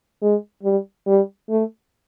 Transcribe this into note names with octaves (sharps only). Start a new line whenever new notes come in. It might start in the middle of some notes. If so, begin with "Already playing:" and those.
G#3
G3
G3
A3